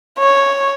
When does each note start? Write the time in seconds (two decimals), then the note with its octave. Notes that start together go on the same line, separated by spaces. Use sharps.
0.19 C#5